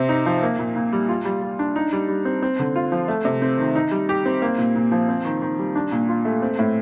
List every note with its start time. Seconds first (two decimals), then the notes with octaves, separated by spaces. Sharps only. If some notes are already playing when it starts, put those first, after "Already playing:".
Already playing: C3 C4
0.09 D#4
0.26 F3
0.43 A#3
0.59 A#2
0.76 A#2
0.93 G3
1.09 F4
1.25 G3
1.42 G3
1.59 D4
1.76 D#4
1.93 G3
2.08 G3
2.25 C4
2.43 C4
2.59 D3
2.76 F4
2.92 F3
3.08 A3
3.25 C3
3.42 C4
3.58 D#3
3.75 D#4
3.91 G3
4.09 G4
4.26 C4
4.42 A#3
4.58 A#2
4.75 A#2
4.92 F3
5.09 C4
5.25 D#3
5.42 D#3
5.59 G3
5.75 D4
5.92 A#2
6.09 F4
6.25 A3
6.42 C4
6.59 A2